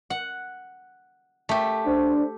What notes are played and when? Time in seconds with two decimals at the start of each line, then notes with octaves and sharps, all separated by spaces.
0.10 F#5
1.49 A3 G4
1.85 D4 C5